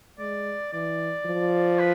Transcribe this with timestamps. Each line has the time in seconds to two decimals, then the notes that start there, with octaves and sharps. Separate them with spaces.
0.19 G#3 D5
0.73 E3 D5
1.26 F3
1.79 B4